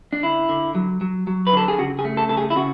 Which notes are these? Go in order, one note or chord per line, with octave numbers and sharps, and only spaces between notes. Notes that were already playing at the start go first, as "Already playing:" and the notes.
D4
D3 E4
D3
F#3
F#3
F#3
B4
D3 A4
G#4
C#3 F#4
G#4
A3
A4
C#3 A4
G#4
E4
C#3 F#4